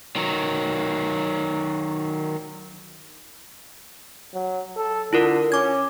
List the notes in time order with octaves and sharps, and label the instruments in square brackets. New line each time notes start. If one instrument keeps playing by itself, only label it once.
[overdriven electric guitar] D#3 F#3
[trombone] F#3
A4
[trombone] D3 [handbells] E4 F4 A#4
[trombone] C#4 [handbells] D6 G#6